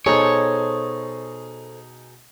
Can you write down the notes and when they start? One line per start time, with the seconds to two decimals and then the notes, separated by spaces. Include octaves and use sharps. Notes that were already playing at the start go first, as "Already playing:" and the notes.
0.06 B2 D#4 G#4 A4 C5 C#5